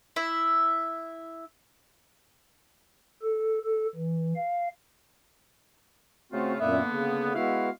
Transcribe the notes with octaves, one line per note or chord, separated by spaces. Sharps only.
E4 E5
A4
A4
E3
F5
C#3 A3 C4 F4 F#4
F#2 A#2 D3 A#3 B3 E5
C#3
G#3 B3 E4 F#4 B4 F5